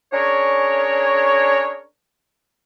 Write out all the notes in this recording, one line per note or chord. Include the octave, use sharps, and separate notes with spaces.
C#4 D4 G#4 A#4 C#5